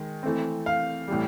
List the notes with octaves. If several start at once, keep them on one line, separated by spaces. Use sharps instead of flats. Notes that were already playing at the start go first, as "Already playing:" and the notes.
Already playing: D#3 G#3
E3 A3 C4
F5
A2 E3 G3